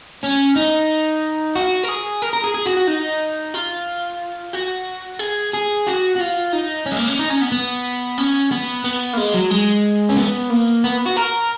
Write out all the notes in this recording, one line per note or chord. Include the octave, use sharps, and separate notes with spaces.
C#4
D#4
F#4
A#4
G#4
A#4
A#4
G#4
G#4
F#4
F#4
D#4
F4
F#4
G#4
G#4
F#4
F#4
F4
D#4
C#4
G#3
A#3
C#4
D#4
C#4
B3
B3
C#4
B3
B3
A#3
G#3
F#3
G#3
C#4
B3
A#3
B3
F#4
A#4